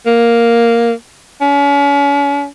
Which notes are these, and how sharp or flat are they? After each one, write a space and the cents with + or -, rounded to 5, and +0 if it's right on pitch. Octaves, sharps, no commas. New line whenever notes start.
A#3 +0
C#4 +40